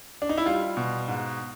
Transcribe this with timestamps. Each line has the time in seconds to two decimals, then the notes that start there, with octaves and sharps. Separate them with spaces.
0.22 D4
0.29 D#4
0.37 E4
0.46 G3 F4
0.77 B2
1.08 G#2